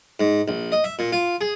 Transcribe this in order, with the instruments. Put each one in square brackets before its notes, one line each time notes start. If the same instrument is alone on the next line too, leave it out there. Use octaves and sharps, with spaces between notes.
[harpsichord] G#2
A#1
D#5
E5
A#2
F4
G#4